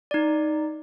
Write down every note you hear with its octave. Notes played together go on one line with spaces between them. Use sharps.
D#4 D5